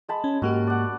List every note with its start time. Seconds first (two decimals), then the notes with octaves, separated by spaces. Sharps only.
0.08 G#3 A5 B5
0.24 C#4
0.42 G#2 A#3 F#4 G4
0.67 D5 F#5